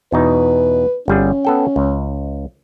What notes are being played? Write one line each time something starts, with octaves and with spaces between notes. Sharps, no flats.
E2 B2 D#4 B4
G1 G3 C#4 G#4
B3 A4 G5
C#2